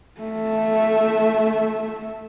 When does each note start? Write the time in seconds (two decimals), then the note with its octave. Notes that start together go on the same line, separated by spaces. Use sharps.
0.21 A3 E5